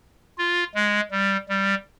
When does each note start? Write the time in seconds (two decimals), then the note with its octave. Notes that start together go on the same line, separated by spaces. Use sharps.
0.38 F4
0.74 G#3
1.11 G3
1.49 G3